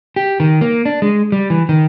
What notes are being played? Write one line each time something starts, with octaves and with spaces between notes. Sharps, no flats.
G4
D#3
A#3
D4
G#3
G3
E3
D#3